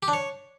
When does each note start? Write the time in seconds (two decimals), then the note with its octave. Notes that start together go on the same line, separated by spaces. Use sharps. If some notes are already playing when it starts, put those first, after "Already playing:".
0.03 G4
0.08 D4
0.13 C#5